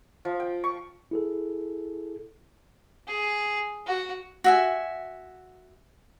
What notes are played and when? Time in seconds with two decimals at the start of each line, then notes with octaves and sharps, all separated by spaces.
0.25 F3
0.40 G5
0.64 C#6
1.11 E4 G#4 A4
3.07 G#4
3.87 F#4
4.44 F#4 E5 G#5